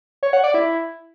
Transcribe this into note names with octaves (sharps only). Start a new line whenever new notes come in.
C#5
F#5
D5
E4